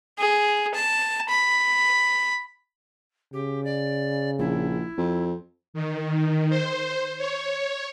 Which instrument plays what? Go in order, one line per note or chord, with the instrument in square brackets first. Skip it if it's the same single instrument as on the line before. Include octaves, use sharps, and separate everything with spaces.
[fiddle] G#4
A5
B5
[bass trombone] C#3 [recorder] G4
[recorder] D5
[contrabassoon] A#1 [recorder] E4
[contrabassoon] F2
[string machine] D#3
C5
C#5